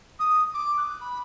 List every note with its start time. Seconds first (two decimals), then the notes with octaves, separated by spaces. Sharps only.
0.19 D#6
0.54 D6
0.78 F#6
1.00 B5